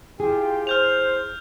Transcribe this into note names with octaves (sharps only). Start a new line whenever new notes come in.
E4 F4 G4 G#4 G5
C5 F6 G6 F7